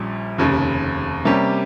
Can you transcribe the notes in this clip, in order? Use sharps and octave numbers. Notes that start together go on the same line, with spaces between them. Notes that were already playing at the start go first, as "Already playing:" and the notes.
Already playing: A#1 A#2 G3 C#4
F1 D#2 C#3
C3 G3 A#3 C#4 G4